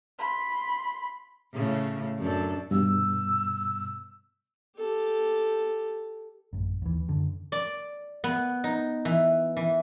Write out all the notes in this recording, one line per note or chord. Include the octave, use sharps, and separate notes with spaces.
B5 C6
A2 C#3
F#2 D4 A4
G2 B2 E6
G4 A4
A1 F#2
D#2 E3
F#2 D3
D5
B3
D#4
E3
E3